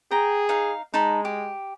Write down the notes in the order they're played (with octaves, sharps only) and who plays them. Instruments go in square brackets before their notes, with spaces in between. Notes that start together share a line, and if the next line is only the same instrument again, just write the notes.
[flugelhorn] G#4 [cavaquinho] G5 A#5
[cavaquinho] D#4 F5
[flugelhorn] G#3 [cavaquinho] D#4 A5 B5
[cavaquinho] G4